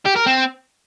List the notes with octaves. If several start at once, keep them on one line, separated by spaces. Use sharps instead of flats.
G4
A#4
C4